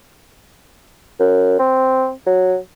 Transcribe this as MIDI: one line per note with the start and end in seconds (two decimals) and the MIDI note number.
1.20 1.58 42
1.59 2.11 60
2.26 2.56 54